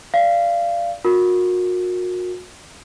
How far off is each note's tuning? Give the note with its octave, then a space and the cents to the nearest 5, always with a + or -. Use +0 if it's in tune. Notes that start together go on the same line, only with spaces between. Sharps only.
D5 +0 F5 -25
F#4 -35 A#4 +0